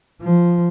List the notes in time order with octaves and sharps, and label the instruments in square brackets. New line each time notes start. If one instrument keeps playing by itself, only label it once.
[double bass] F3